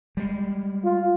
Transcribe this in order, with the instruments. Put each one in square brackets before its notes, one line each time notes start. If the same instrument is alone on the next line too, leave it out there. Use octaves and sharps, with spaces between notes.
[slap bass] G3 G#3
[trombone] F4